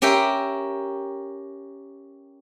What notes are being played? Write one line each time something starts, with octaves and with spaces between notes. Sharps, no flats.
C#4 G4 A#4 E5 G5 C6